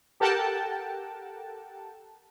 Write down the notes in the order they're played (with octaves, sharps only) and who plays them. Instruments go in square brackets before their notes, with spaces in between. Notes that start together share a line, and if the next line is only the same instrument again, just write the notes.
[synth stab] G4 A4 A#4 F#5 G5 A5